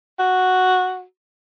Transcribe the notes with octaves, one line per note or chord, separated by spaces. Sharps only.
F#4